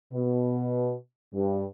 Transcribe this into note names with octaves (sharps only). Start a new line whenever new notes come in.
B2
G2